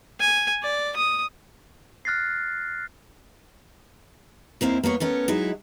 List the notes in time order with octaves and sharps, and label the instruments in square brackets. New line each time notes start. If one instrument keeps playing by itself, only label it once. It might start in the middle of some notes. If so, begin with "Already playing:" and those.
[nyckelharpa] G#5
D5
D#6
[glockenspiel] F6 F#6 A6 A#6 C7
[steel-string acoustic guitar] D#2 A#3 C4 E4
A#3 B3 A4 C#5
A3 B3 C#4 A#4
F#3 G#3 D#4 E4